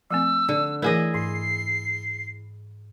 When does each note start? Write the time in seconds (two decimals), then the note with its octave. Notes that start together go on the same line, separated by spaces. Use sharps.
0.11 F3 A3 C4 E6
0.49 D3
0.82 E3 A3 E4 G#4 A#4 D#5
1.14 G#2 C7